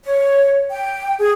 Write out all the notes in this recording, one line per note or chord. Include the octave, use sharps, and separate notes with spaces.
C#5
G5
G#4